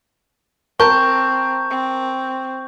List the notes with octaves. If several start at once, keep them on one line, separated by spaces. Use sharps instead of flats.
C4 A#4 A5 C#6 G6
C4